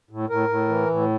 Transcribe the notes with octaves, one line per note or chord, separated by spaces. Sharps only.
A2
A2 A#4
A2
E3
A2